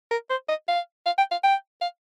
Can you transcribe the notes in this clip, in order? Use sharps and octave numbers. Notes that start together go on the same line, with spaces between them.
A#4
C5
D#5
F5
F5
G5
F5
G5
F5